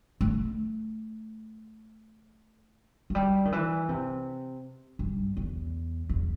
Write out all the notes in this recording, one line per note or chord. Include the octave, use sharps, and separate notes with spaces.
A3
F#3
G3
D#3
E3
C3
G2
E2
E2